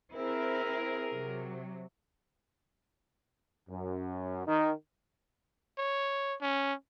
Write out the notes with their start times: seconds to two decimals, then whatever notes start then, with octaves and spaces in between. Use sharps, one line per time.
0.14 C4 E4 G#4 A#4
1.12 C3 F#3
3.69 F#2
4.47 D#3
5.78 C#5
6.41 C#4